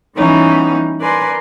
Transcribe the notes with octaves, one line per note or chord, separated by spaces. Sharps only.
E3 G3 B3 C#4 D#4
A#4 B4 D5 G#5 C6